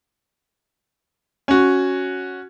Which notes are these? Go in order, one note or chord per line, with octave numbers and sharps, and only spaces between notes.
C#4 F#4